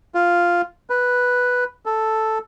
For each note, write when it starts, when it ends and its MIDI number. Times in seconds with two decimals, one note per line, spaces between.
0.15 0.62 65
0.90 1.64 71
1.86 2.38 69